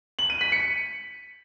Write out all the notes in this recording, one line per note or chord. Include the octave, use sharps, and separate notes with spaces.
F#7
D#7
B6
C#7